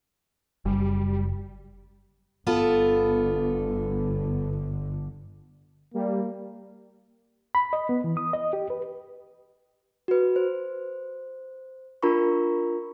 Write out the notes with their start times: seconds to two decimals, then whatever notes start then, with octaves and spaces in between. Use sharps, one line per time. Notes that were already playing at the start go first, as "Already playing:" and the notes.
0.65 F#1 G3
2.47 G1 D3 B3 F4 A4
5.94 G3 A#3
7.55 B5
7.73 D#5
7.89 B3
8.04 E3
8.17 D#6
8.33 D#5
8.53 G4
8.70 B4
10.08 F#4 B4
10.36 C5
12.03 D4 F4 A#4 A#5 B5 C#6